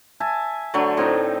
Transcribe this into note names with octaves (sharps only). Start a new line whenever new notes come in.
E5 G#5 A5
D3 F#3 A3
A2 C4 D#4